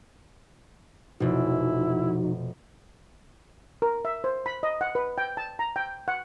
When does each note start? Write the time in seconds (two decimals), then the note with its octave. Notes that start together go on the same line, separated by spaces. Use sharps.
1.20 F1 B2 F3 D#4 E4 F#4
3.82 A#4
4.05 E5
4.24 C5
4.46 B5
4.63 D#5
4.81 F#5
4.95 B4
5.18 G5
5.37 A5
5.59 A#5
5.76 G5
6.08 F#5